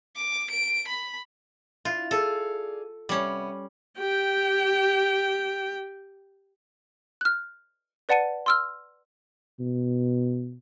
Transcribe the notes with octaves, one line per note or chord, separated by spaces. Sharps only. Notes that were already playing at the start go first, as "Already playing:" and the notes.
D6
D7
B5
D4 E4 F4
G#4 A4 D5 F5
C3 G3 B3 C#4
G4 G5
F6 F#6
B4 D5 F#5 A5 C#7 D#7
C6 E6 F6
B2